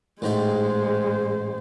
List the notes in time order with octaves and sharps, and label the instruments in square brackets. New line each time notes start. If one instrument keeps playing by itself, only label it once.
[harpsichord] A1 G#2 G5 [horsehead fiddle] G#3 C5